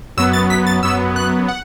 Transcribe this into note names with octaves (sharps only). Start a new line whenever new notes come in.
F#2 F#3 B3 E6
A6
B6
A6
F#2 F#3 B3 E6
F#6
F#5